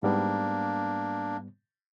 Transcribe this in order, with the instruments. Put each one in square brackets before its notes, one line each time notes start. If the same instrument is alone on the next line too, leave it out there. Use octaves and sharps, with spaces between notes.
[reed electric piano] G#2 G3 B3 [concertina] A#3 D4